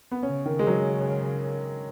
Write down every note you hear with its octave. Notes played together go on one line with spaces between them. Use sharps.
B3
C#3 C#4
D#3
G#3
F#3